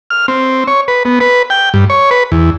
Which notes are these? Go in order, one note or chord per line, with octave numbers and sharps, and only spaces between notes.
F6
C4
C#5
B4
B3
B4
G5
G2
C#5
B4
E2